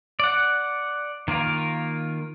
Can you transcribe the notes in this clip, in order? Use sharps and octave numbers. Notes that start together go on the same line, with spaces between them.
D5 F#5
D#3 A#3 F4 A#4